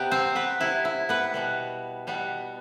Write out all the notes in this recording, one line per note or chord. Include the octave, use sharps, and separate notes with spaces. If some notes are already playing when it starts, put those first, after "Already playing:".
Already playing: C3 G3 B3 G4
C4 C5
B3 B4
C3 G3 B3 E4
E4
B3 B4
B2 G3 B3
B2 G3 B3